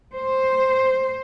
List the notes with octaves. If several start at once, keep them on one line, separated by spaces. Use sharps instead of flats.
C5